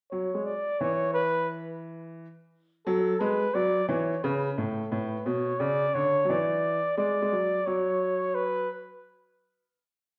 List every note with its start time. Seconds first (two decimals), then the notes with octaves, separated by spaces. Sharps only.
0.11 F#3 C#5
0.34 G#3
0.45 D5
0.80 E3 C#5
1.14 B4
2.86 F#3 A4
3.20 G#3 B4
3.55 F#3 D5
3.89 E3 C#5
4.24 C#3 B4
4.58 A2 A4
4.92 A2 B4
5.26 B2 C#5
5.60 C#3 D5
5.94 D3 C#5
6.25 F#3
6.29 E3 D5
6.97 G#3 D5
7.22 G#3
7.32 F#3
7.66 F#3 C#5
8.35 B4